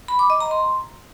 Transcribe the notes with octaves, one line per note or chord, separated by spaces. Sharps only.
B5
D6
D#5
A#5
C6